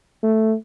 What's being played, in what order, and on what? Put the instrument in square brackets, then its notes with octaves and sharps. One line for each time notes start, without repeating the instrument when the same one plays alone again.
[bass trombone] A3